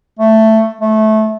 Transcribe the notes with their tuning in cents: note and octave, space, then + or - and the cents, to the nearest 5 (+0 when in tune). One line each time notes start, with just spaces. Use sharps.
A3 +5
A3 -20